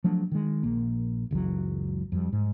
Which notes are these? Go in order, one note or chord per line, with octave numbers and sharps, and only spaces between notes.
F3 F#3 A3 D4
D#3 G#3
A#1 A#3
F#1 C#2 E3 F#3
F2 G3
G#2